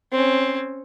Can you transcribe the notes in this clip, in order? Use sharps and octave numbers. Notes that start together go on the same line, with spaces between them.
C4 C#4